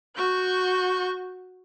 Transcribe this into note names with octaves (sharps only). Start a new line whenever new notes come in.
F#4 C#6 G6